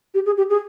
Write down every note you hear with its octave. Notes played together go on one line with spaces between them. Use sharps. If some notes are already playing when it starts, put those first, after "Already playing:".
G4
G#4
G4
G#4